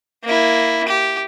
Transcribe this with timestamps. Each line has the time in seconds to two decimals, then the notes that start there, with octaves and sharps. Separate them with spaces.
0.24 A#3 E4
0.89 G4